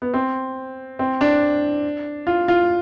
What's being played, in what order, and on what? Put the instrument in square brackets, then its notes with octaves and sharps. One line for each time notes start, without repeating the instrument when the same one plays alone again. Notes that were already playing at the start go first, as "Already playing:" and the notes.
[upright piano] B3
C4
C4
D4
F4
F4